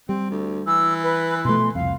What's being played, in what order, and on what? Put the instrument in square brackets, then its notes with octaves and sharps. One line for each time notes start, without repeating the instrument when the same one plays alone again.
[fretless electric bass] G3 [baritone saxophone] C4
[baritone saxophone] D2
[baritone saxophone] E3 [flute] E6
[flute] B4
[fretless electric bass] B2 F3 A3 [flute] C6
[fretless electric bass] C2 F2 [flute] F5